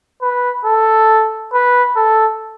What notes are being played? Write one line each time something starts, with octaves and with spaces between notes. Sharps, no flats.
B4
A4
B4
A4